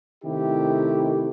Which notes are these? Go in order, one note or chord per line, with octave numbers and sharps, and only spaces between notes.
C3 D#3 A3 E4 G4